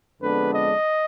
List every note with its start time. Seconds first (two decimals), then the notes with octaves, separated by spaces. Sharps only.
0.21 F2 D3 G#3 B3 D4 B4
0.54 D#5